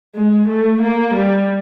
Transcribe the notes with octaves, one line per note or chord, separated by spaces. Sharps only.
G#3
A3
A#3
G3